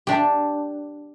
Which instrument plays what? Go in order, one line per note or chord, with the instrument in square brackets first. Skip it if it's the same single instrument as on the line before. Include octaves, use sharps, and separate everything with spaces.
[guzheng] D4 G4